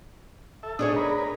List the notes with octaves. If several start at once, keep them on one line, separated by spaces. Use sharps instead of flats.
A4 E5
A2 D4 D#4 G#4 C#5 D#5
A#4 B4